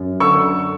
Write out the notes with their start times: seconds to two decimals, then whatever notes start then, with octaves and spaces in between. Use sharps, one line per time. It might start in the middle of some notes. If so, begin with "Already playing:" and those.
Already playing: F#2
0.20 D3 C#6 E6